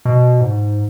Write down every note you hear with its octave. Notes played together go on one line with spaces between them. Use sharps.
B2
G#2